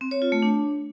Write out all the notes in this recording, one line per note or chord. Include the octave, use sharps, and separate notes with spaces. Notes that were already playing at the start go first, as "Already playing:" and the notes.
C4
C#5
F4
A3
D4